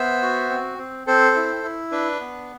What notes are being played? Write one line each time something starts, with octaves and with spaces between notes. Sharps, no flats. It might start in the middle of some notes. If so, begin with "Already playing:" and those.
Already playing: B3 C5 E5
F#4
C4
C4
C4 A4 C5
E4
E4
D4 B4
B3